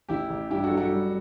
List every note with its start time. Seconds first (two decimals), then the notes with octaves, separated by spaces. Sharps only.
0.09 A1 E4 G4
0.29 A1
0.51 G2 E4 G4
0.64 F#4 A4
0.71 F#3
0.77 F#4 A4
0.91 G3